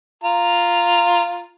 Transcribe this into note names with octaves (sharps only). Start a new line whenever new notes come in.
F4 A#5